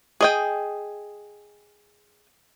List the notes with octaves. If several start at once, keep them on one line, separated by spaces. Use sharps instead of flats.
G#4 D#5 G5